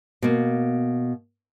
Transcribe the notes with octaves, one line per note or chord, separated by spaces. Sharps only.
B2 A#3